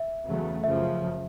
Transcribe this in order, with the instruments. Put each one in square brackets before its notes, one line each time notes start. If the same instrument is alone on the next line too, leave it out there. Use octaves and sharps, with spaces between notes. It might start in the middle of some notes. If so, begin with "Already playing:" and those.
Already playing: [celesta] E5
[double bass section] E2 C#3 F#3 A3
[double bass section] F#2 C#3 F3 [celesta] E5